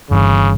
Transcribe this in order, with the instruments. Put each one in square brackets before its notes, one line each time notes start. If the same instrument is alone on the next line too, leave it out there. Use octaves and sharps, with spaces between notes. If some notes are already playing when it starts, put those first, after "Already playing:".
[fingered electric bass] G1 G2 E3 [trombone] C#3